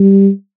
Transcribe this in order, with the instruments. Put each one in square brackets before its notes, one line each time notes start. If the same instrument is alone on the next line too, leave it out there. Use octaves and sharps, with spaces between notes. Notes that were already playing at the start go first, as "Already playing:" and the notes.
Already playing: [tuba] G3